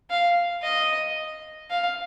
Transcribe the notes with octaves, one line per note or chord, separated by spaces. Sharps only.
F5
D#5
F5